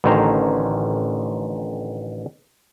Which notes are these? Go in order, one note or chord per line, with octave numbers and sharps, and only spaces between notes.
A1 D3 D#3 C#4 C5 A#5